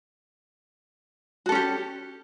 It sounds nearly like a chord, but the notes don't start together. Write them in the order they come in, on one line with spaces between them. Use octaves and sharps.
F#4 A4 C#4 G4